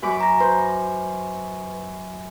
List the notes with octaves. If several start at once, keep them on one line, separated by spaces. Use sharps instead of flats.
F#2 B4 D6
A#5 A#6
B4 C5